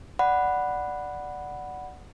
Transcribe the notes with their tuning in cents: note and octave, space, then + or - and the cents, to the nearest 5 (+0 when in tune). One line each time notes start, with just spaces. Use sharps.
D5 +5 F#5 +0 B5 +0